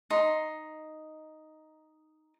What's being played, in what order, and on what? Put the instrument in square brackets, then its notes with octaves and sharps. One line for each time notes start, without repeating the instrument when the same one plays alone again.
[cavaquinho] D#4 C6